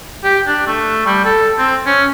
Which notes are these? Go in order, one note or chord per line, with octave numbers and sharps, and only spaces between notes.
G4
D4
A3
G3
A4
C4
C#4